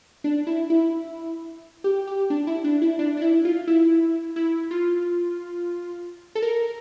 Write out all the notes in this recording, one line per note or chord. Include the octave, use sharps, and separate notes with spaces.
D4
E4
E4
G4
G4
D4
E4
D4
E4
D4
D4
E4
F4
E4
E4
F4
A4
A#4